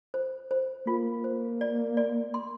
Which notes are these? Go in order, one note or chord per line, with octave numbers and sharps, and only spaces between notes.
C5
C5
A#3 F4
C5
D5
D5
C6